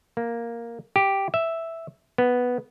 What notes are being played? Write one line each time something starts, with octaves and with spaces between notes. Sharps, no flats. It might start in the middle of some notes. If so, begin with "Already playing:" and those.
A#3
G4
E5
B3